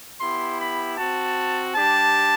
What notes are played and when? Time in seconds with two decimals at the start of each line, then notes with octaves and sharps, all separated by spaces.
0.21 B3 E4 G4 C6
0.60 B5
0.98 C4 F#4 A5
1.75 G3 D4 G4 A5